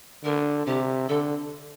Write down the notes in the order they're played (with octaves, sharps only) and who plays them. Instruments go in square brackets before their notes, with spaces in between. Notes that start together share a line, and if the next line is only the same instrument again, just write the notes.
[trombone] D3 [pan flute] A#4
[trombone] C3 [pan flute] G4
[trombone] D3 [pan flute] A4